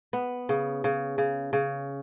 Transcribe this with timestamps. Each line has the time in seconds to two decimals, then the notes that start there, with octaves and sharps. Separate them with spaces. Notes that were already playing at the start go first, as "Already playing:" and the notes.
0.13 B3
0.49 C#3
0.84 C#3
1.18 C#3
1.53 C#3